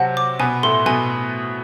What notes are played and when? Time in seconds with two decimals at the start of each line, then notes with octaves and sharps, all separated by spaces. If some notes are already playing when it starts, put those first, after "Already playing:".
Already playing: C3 F#3 C4 F#5 A5
0.17 D6
0.39 B2 B3 G#5
0.63 A2 A3 C6
0.86 B2 B3 G#5